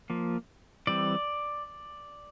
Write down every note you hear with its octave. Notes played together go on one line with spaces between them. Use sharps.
F3 A#3
E3 G3 C4 D5